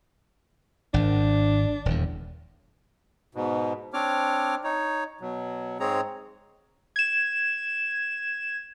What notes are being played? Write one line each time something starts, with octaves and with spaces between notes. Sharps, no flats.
G#1 D4
D#1 E2
G#2 B2
C4 D4 C#5 D6 F6
D#4 C#5
B2 F#3
G#2 G#3 C4 G#4 C#5 A#5
G#6 E7